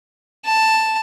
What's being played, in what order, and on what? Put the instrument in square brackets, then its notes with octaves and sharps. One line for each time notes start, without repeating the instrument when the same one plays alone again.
[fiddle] A5